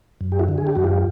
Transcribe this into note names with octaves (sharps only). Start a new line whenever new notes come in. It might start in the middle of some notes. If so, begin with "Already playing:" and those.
F#2
G4
E4 F#4
D3
G#4
G4
F#2 F#4
F4 G4